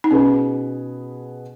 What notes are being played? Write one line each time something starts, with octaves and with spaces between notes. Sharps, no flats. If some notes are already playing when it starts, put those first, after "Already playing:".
D#4
B2 B3 C#4 G#4 B4